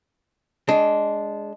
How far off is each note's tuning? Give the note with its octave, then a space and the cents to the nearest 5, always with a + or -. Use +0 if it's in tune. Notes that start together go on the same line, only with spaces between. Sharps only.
G#3 +0 D4 -15